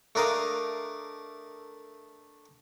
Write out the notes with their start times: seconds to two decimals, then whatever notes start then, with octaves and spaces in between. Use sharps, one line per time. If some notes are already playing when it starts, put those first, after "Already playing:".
0.15 A3 D4 A#4 D#5 F5